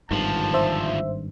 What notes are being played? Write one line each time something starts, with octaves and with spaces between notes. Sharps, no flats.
G#1 D2 G2 D#3 F3 A5
C5 E5